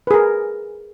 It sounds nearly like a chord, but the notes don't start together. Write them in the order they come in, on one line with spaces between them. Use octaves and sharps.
B4 G#4 A#4